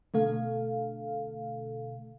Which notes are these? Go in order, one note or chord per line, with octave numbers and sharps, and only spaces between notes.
B2 D3 A3 A4 F5